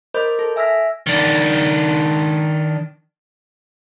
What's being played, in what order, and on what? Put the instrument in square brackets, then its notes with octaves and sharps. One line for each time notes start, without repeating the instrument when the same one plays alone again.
[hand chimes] A#4 C5 D#5 B5 D6 G6
A4
E5 G#5 E6 F6 A#6 B6
[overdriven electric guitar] D#3 D4